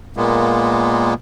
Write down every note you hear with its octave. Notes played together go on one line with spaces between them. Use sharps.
A#2 G#3 A#3 B3